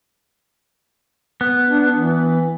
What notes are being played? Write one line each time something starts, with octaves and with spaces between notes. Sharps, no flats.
B3
D4
E3